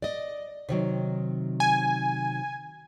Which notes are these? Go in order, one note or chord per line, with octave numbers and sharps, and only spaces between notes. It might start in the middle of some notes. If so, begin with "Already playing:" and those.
D5 D#5
C3 D#3 F#3
G#5